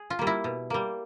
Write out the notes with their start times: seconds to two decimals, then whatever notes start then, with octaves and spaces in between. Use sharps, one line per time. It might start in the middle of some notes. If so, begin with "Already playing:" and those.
Already playing: G#4
0.10 F4
0.19 G3 A#3
0.27 E4
0.44 B2
0.70 G3 A#3